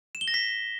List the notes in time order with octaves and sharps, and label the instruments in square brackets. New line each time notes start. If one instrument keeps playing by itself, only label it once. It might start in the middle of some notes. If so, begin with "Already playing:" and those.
[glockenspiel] E7
G7
A#6
B6